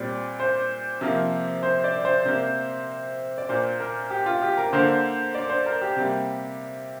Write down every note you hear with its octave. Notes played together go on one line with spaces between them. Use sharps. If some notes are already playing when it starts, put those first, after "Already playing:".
Already playing: A#2 G3 C4 D5
C5
C3 F3 A#3
C5
D5
C5
C3 A#3
D5
A#2 A#3 C5
A#4
G4
F4
G4
A#4
D3 A#3 C5
D5
C5
A#4
G4
C3 G3 A#3